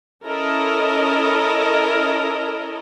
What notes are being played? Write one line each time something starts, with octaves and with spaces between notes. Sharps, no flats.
C#4 E4 A4 A#4 D#5